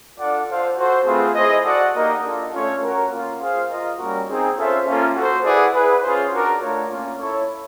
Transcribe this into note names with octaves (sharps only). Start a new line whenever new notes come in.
D4 F4 A4 D5 F#5
F4 A4 C5 F5
F#4 A4 C5
A3 C4 F4 G#4 B4
E4 G#4 C5 D#5
F#4 A4 D5 F#5
A#3 D#4 G4 A#4 D#5
D4 F4 A4
A3 C#4 F4 A4 C#5
C#4 F#4 A#4 C#5 F#5
A#3 C#4 F4
F4 G#4 C5 F5
F4 A#4 D#5
G3 A#3 C#4 F#4 A#4
C4 D#4 G#4
C#4 F4 A4 C5 E5
A#3 C#4 F4 A4
F#4 A4 C5
E4 G#4 B4 D5 F#5
E4 G#4 B4
C#4 F4 G#4 C5
D4 F#4 A#4 D5
A3 D4 F4 A#4 C#5
A#3 C#4 F4
E4 A4 C#5